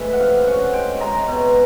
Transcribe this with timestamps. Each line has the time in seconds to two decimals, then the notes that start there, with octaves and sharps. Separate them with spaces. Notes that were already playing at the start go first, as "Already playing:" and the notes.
Already playing: A2 E3 G#3 B4 E5
0.13 F#5
0.20 C3 F5
0.46 C#4 F#5
0.73 G#3 G5
1.01 G#3 A#5
1.28 B2